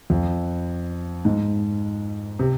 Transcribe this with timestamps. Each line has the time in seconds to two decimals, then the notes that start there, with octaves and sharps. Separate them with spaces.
0.10 F2
1.25 G#2
2.39 C3